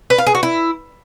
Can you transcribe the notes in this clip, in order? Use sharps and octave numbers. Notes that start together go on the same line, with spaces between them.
B4
F5
G#4
F#4
E4